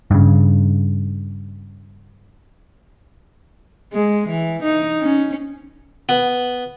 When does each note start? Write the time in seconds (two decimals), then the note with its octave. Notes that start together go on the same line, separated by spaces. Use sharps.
0.11 G2 C#3
3.93 G#3
4.29 E3
4.63 D#4
5.01 C#4
6.09 B3